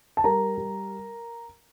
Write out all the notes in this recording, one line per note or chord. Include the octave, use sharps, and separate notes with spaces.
A5
G3 A#4 A#5
G3